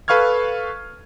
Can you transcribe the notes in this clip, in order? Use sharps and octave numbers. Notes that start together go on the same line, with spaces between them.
A4 B4 F5 C#6 F6 G#6